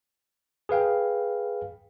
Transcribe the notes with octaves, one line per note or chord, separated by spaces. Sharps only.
G#4 B4 F5 G5